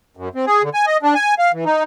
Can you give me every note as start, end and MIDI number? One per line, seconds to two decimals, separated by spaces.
0.17 0.29 42
0.35 0.45 60
0.47 0.62 68
0.63 0.69 50
0.74 0.85 80
0.87 0.97 75
1.03 1.14 62
1.15 1.34 80
1.39 1.52 77
1.53 1.64 52
1.65 1.83 63